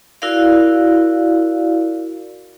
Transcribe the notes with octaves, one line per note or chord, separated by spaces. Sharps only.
E4 F#4 A#4 D5 F5